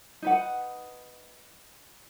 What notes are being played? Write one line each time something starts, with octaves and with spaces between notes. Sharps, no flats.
D#4 B4 F#5